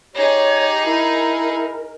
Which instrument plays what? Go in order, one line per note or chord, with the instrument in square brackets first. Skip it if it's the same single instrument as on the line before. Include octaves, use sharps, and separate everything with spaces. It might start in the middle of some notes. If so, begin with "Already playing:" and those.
[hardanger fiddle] D#4 G#4 [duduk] G4 [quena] C#5
[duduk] E4 [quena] A#4